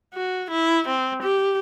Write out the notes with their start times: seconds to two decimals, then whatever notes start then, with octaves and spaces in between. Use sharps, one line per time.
0.14 F#4
0.51 E4
0.88 C4
1.23 G4